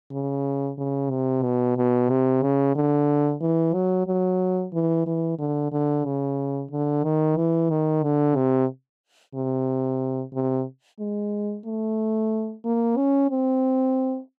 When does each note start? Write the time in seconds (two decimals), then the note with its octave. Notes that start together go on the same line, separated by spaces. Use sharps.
0.12 C#3
0.78 C#3
1.11 C3
1.43 B2
1.77 B2
2.10 C3
2.42 C#3
2.76 D3
3.41 E3
3.74 F#3
4.07 F#3
4.73 E3
5.07 E3
5.39 D3
5.72 D3
6.05 C#3
6.71 D3
7.04 D#3
7.37 E3
7.70 D#3
8.03 D3
8.36 C3
9.34 C3
10.33 C3
11.00 G#3
11.66 A3
12.65 A#3
12.97 C#4
13.30 C4